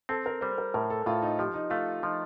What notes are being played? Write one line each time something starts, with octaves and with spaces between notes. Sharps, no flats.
C4 A4
A#4
G3 C5
A#4
A2 A#4
A4
A2 F4
D#4
F3 G4
D#4
A3 F4
F3 D#4